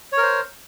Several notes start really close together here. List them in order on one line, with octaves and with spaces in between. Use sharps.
C#5 A#4 C5